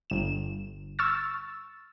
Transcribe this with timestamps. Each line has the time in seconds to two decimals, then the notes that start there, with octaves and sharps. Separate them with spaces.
0.10 G1 E7
0.99 C#6 E6 F6 A6